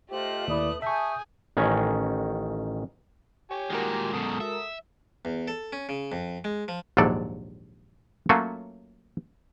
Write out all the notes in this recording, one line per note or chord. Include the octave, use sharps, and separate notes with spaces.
A3 F4 G4 C5 D#5 F#6
D#2 E4 B4 D5 D#6
G#4 E5 G#5 A5 C#6 D#6 G6
A1 D#3 C#4 G#5
G4 C#5 G#5
A#2 D#3 G#3 F#4 A#4
F#2 B2 A4 D#6
E5
E2
A4
C#4
C#3
F2
G#3
F3
A#1 D#2 G#2 F#3 A4 D5
F#3 A3 A#3 C#4 F4 F#4